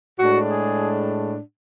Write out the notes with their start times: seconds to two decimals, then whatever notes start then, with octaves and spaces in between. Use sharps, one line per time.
0.19 A2 G#3 D4 F#4
0.49 G#4